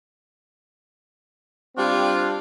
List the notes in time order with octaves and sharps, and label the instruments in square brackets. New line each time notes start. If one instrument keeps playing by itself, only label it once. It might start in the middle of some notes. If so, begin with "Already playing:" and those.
[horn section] G3 C4 D4 F4